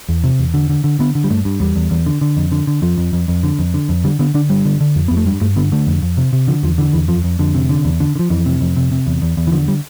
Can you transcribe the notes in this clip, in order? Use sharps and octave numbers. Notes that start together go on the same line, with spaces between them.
E2
C3
E2
D3
D3
D3
D3 B3
D3
G3
G2 A3
G2
E2 G3
E2
E2
D3
D3
F2
D3
D3
F2 F3
F2
F2
F2
D3
F2
D3
F2
D3 G3
D3 B3
D3 D4
G2 G3
D3
D3
F2
F2 B3
A3
G2 G3
G2 A3
D3 B3
D3 A3
F2
F2
C3
C3
D3 F3
E2 F3
D3 E3
E2 E3
F2 F3
F2
F2 D3
C3
D3
E2
D3
D3
F3
F2 E3
C3
F2
C3
C3
E2
E2
E2
E3
D3 F3
G3